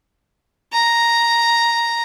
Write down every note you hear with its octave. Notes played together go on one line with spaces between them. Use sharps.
A#5